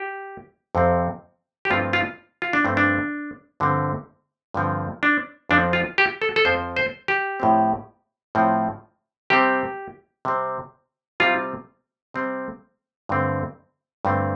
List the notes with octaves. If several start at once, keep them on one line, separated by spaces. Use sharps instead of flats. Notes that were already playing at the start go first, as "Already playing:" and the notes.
Already playing: G4
F2 C3 F3 C4
G4
G2 F3 A3 C4 F4
F4
F4
D4
G2 F3 A3 C4
D4
G2 D3 F3 C4
G2 D3 F3 C4
D4
F2 F3 C4 D4
F4
G4
A4
A4
F2 F3 C4 C5
C5
G4
A2 F3 C4
A2 F3 C4
C3 G3 C4 G4
C3 G3 C4
C3 G3 C4 F4
C3 G3 C4
G2 D3 A3 C4
G2 D3 A3 C4